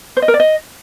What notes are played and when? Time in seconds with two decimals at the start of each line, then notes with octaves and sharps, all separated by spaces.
0.17 C5
0.22 D#5
0.28 A#4
0.34 D5
0.40 D#5